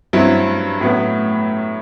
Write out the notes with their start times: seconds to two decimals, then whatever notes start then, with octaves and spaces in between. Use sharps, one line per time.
0.13 G2 F#3 C4 E4
0.81 A2 F#3 B3